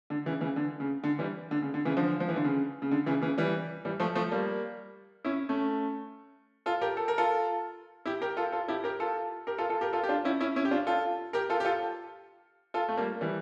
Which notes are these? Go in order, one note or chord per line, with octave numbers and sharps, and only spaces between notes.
D3
C#3 E3
C#3 E3
D3
C#3
D3
E3 G3
D3
C#3
D3
C#3 E3
D3 F3
F3
E3
D3
C#3
C#3
D3
C#3 E3
C#3 E3
E3 G3
E3 G3
F3 A3
F3 A3
G3 A#3
C#4 E4
A3 C#4
F4 A4
G4 A#4
A4
A#4
F4 A4
E4 G4
G4 A#4
F4 A4
F4 A4
E4 G4
G4 A#4
F4 A4
G4 A#4
F4 A4
F4 A4
G4 A#4
F4 A4
G4
D4 F4
C#4 E4
C#4 E4
C#4 E4
G4
D4 F4
F4 A4
G4 A#4
F4 A4
G4
F4 A4
F4 A4
A3
G3 A#3
E3 G3